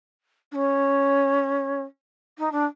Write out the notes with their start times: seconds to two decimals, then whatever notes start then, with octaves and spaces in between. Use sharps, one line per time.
0.51 D4
0.55 C#4
2.38 D#4
2.52 D4